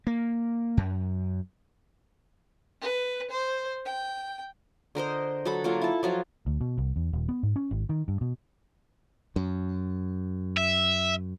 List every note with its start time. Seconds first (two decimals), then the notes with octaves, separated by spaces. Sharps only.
0.07 A#3
0.77 F#2
2.81 B4
3.30 C5
3.85 G5
4.95 D3 A#4 C5 D#5
5.45 F#3 A4 B5
5.64 F#3 A#3 F4 A4
5.82 E4 A5
6.03 F3 F#3 F4
6.46 D2
6.61 B2
6.78 C2
6.96 E2
7.13 D#1
7.28 B3
7.43 G#2
7.56 C#4
7.71 G#1
7.89 D#3
8.08 G2
8.21 B2
9.36 F#2
10.57 E5